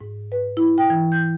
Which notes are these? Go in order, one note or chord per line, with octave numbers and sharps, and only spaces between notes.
G#2
B4
E4
G5
E3
G6